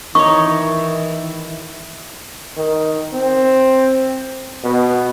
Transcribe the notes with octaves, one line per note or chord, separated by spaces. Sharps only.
D#3 E3 D#4 E4 C#5 C#6
D#3
C4
B2